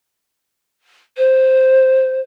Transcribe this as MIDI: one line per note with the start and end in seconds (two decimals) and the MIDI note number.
1.17 2.20 72